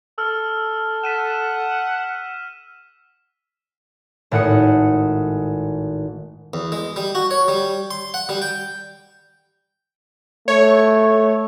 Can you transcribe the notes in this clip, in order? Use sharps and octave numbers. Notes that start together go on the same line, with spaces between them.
A4 E6 F6
F#5 B6 D#7 E7
G#1 A2 F#5 D#6 C#7
E2
G#3
G3
F#4
C#5
G3
C6
F#5
G3
G5
A3 C#5